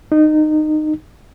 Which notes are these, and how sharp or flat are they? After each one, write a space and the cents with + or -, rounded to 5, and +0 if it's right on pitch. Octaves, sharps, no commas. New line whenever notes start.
D#4 -20